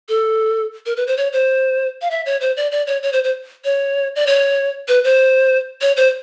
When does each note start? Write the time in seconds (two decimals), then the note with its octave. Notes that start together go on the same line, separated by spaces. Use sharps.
0.09 A4
0.86 A#4
0.97 B4
1.07 C5
1.17 C#5
1.33 C5
2.02 F5
2.10 E5
2.26 C#5
2.41 C5
2.57 D5
2.72 D5
2.87 C#5
3.03 C#5
3.13 C5
3.24 C5
3.65 C#5
4.16 D5
4.27 C#5
4.88 B4
5.04 C5
5.81 C#5
5.97 C5